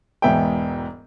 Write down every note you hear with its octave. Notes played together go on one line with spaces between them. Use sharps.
E1 G#2 B3 G#4 E5 G5